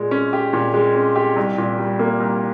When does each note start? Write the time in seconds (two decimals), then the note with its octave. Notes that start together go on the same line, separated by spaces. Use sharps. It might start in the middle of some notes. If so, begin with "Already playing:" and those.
Already playing: A#2 G#3
0.11 C#4
0.33 G4
0.53 A#2
0.74 G#3
0.95 C#4
1.16 G4
1.36 C2
1.58 A#2
1.79 G3
1.99 A#3
2.20 C2